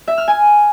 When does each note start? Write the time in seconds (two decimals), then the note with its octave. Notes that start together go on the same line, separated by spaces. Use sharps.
0.08 E5
0.18 F6
0.28 G#5